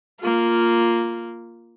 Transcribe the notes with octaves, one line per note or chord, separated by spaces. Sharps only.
A#3 F4